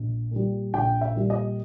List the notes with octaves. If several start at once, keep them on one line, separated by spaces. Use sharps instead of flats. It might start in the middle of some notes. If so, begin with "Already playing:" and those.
Already playing: A#1
A#2 G3
A#1 G5
E5
A#2 G3
D#5